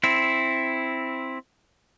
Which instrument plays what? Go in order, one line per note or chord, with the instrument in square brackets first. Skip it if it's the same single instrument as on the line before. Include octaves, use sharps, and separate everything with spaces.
[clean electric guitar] C4 E4